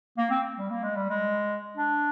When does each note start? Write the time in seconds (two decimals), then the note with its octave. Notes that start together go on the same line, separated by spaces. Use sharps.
0.18 A#3
0.30 C4
0.58 G3
0.70 A#3
0.83 G#3
0.96 G3
1.10 G#3
1.77 D4